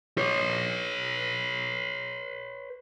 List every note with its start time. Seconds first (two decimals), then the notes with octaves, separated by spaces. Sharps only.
0.18 B4 C#5